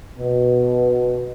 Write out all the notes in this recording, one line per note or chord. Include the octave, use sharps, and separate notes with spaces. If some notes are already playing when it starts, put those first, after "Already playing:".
B2